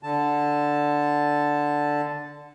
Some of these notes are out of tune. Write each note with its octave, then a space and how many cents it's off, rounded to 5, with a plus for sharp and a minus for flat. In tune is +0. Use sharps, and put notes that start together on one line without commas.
D3 +0 A5 +0